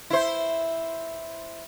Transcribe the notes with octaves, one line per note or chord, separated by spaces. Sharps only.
E4 C5